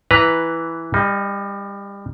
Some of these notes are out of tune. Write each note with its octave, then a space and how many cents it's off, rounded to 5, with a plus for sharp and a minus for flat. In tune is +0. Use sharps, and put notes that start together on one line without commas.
E3 +0 B4 +0 A#5 +0
G3 +30 D#4 +0